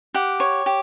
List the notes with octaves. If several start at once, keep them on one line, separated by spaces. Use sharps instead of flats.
G4 F#5
C#5
G4